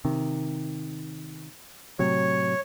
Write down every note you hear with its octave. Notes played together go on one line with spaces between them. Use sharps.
C3 D#3
A2 C3 F#3 C#5